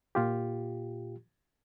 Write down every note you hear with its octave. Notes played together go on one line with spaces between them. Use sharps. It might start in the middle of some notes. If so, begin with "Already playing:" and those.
A#2 F4 G4